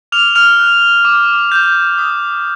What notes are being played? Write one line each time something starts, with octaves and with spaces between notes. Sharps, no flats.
D6 F6 F7
F6 F7
F#6
D6
G6
D#6